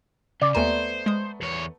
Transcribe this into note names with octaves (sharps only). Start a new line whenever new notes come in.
C#3 D5
D#2 A3 B3 C5 G#5 A#5
G#3 D#6
E2 C#5